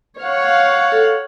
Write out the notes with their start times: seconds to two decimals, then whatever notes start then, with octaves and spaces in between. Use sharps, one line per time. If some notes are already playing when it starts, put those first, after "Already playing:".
0.20 C#5 F5 F#5
0.92 A4